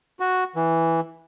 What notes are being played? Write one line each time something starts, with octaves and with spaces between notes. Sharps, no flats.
F#4
E3